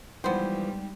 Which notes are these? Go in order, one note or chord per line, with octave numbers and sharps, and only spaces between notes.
E3 F3 G3 G#3 B3 D#4 C5 G5